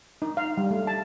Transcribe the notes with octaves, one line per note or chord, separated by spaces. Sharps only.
D#4
F5
G3
A3
A5